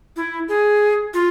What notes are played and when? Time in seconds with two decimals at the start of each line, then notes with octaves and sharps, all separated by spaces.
0.16 E4
0.48 G#4
1.14 F4